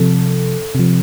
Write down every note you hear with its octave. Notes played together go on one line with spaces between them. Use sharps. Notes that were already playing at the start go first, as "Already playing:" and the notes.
Already playing: C3 F3 A4
C3 F3